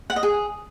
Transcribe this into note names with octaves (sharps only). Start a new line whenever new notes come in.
F#5
D#5
G#4